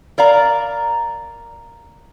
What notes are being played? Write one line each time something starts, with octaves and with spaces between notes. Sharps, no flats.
A#4 D5 F5 A#5